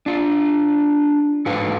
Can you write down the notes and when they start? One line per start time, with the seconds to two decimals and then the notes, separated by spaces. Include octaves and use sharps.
0.06 D4 F4
1.46 G#2 F#4 A4 B4 F5